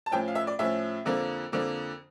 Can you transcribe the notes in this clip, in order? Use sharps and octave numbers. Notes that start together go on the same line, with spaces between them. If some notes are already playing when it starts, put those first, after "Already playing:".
A5
A2 F3 C#4 G5
F5
E5
D5
A2 F3 C#4 E5
F2 D3 F3 A#3
F2 D3 F3 A#3